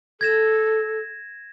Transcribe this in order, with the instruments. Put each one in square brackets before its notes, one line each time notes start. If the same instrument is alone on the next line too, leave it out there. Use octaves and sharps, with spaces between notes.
[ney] A4 [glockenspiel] G#6 A#6 E7